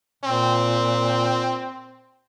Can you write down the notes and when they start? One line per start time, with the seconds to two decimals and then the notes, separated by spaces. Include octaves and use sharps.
0.24 A#2 C4